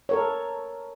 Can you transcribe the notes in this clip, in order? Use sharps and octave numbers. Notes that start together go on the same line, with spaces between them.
A4 A#4 C#5